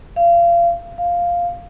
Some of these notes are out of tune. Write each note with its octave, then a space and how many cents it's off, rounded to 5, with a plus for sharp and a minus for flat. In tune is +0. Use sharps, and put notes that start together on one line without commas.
F5 -30
F5 +0